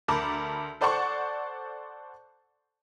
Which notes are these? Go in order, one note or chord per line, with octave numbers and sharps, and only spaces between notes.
D2 A#4 A5 B5 D6
A4 C5 D5 F#5 A5 C#6